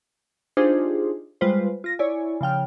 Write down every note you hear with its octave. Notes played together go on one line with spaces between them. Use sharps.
D4 D#4 F4 G4 G#4 C5
G3 G#3 F4 B4 C5
F4 A#6
E4 C#5 D5 G#5
C#3 F3 G5 F6